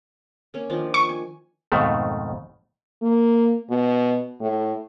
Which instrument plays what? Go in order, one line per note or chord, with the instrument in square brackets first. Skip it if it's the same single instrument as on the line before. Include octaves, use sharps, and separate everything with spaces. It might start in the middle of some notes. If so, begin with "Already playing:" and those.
[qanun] A#3 C#4
D#3 F3 D4
[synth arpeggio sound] C#6
[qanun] G#5
[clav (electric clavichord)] F2 G#2 B2 D#3 A3
[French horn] A#3
B2
A2